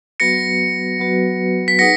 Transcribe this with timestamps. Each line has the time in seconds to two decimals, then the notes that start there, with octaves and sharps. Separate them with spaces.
0.20 F#3 B3 F#4 B4 A#6 C#7
0.99 F#3 B3 F#4 B4
1.68 B6
1.79 D#4 G#4 B4 F#5 A#6 C#7